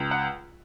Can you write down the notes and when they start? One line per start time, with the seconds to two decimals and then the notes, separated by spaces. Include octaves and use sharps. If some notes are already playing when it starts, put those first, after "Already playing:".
Already playing: C#2
0.11 F#5